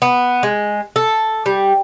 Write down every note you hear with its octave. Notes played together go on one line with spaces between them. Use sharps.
B3
G#3
A4
G3